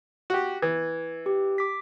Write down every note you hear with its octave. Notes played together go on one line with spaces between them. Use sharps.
F#4 G4
E3 G#6
G4
D6 B6